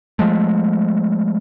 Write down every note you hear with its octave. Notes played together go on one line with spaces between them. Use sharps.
F3 G#3 A3